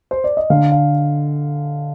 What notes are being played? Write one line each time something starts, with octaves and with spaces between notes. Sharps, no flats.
C5
D5
D#5
D3 F5
F5